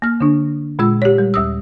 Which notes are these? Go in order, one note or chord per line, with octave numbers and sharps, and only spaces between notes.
A#3 F6
D3 D4
A#2 G#3 F4 E6
G4 C#5
G3
D#2 D#6 E6